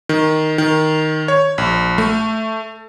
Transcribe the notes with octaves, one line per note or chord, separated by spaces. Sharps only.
D#3
D#3
C#5
A#1
A3